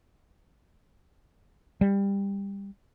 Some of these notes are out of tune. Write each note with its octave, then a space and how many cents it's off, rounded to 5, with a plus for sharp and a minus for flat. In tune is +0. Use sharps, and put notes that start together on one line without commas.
G3 +20